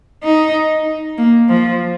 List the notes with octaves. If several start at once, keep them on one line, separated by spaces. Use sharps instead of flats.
D#4
A#3
F3